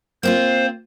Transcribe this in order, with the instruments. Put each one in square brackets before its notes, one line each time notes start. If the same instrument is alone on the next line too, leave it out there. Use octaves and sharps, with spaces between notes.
[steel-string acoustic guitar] A#3 C4 F4 [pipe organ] C5